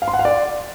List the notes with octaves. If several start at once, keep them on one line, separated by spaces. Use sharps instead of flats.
F5
C6
F#5
F5
D5